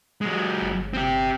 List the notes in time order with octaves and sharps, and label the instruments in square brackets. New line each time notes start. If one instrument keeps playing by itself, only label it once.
[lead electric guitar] F#3 G#3
[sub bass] G1
[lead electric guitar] C4 G4